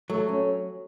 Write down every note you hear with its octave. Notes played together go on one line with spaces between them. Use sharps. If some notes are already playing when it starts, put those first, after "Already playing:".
F#3 A3
C#4